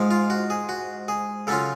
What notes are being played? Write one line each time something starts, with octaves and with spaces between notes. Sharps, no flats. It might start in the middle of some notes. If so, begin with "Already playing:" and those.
Already playing: G#2 F3 G#3
F4
F#4
G#4
F#4
G#4
C#3 F#3 C#4 F4 A4